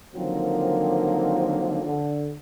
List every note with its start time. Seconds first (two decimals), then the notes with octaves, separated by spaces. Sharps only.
0.14 D3 D#3 F3 F#3 A#3 C4
1.83 D3